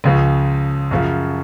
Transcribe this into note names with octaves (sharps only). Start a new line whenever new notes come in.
C#2 C#3 F3
F#2 C#3 F3